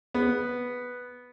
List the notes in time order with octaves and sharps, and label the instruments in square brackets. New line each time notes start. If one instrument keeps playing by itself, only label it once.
[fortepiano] B3